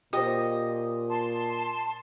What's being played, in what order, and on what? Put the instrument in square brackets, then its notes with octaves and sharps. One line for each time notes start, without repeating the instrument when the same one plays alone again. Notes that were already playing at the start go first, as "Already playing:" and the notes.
[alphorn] A#2 [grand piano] G4 C5 [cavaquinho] D#5
[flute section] A5 C6